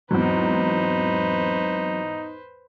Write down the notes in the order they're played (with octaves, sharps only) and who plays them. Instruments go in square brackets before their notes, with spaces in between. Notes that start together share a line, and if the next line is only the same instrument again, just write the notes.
[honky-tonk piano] E2 G#2 [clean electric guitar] F#3 C4 [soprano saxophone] D#4 [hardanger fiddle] B4 C5